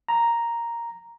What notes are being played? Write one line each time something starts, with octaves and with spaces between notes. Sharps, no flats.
A#5